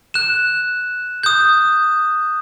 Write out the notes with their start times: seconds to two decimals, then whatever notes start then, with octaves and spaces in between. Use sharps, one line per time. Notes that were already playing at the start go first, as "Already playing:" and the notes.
0.14 F#6 E7
1.23 D#6 G6